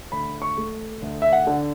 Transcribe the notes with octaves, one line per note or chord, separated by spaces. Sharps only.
D2 B5
C#6
A3
D2
E5
F#5
D3